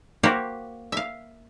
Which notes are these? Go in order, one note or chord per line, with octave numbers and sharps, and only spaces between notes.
A#3 F#4 G4 C5
E5 F5